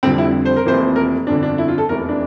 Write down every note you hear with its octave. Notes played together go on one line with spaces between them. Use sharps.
F1 F2 D3 G3 C4
E4
C5
A#4
F1 F2 E3 A#3 C5
A#4
G1 F2 D3 D4
D4
E4
F4
A4
F1 E2 E3 A#4
D4